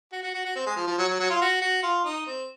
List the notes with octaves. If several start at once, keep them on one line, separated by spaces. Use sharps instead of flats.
F#4
F#4
F#4
F#4
C4
G#3
F3
F3
F#3
F#3
F#3
F4
F#4
F#4
F4
D#4
C4